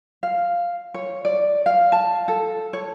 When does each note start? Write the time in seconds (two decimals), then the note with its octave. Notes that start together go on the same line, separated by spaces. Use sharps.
0.23 F5
0.94 C#5
1.25 D5
1.66 F5
1.92 A5
2.28 A4
2.73 C#5